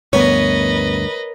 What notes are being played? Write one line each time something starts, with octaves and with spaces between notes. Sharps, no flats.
D2 G2 B3 A#4 B4 C#5 D#5